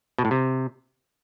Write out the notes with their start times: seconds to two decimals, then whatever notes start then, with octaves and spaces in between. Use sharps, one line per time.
0.18 B2
0.25 A2
0.31 C3